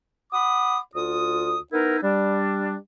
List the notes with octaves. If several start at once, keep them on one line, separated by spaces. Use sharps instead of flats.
F#5 B5 D6 D#6
D2 F4 D#6
B3 D#4 E4 A#4
G3 D4